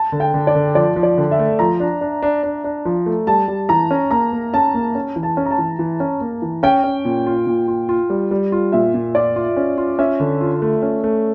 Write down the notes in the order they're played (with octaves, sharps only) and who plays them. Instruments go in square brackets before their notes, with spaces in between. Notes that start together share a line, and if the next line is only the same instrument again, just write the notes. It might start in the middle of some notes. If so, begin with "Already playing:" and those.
Already playing: [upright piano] A5
[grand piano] D3
[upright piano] G5
[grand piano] D3
[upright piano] D5
[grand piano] D3
[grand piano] F3 [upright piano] D5
[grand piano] F3
[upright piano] D5
[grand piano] D3
[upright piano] E5
[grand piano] A3
[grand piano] F3 [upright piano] A#5
[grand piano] D4
D4
D4
D4
D4
F3
A3
[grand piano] G3 [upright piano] A5
[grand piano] G3
[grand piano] E3 [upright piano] A#5
[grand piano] C#4
[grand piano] A#3 [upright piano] A#5
[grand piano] A#3
[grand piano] C#4 [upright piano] A5
[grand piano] A#3
C#4
E3
[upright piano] A5
[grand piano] C#4
[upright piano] A#5
A5
[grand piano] E3
E3
C#4
A#3
E3
[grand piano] C#4 [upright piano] G5
[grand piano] C#4
A#2
F4
A#2
F4
F4
G3
G3
F4
[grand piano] A#2 [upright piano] E5
[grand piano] A#2
[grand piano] F4 [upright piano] D5
[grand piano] F4
C#4
F4
[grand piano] C#4 [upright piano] E5
[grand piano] D3
F4
A3
C#4
A3